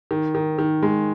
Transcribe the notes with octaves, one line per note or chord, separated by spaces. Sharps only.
D#3
D#3
D#3
G#3